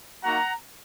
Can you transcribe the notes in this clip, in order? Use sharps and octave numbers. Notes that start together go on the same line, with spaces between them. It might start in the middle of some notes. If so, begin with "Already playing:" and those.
A#3 D#4 F#4 F#5 A#5